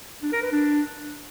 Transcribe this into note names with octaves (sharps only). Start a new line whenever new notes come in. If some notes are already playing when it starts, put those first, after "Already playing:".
D4
A#4
B4
D4